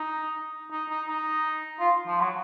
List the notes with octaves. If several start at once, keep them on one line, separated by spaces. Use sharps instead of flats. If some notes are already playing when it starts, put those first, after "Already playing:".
Already playing: D#4
D#4
D#4
D#4
F4
F3
F#3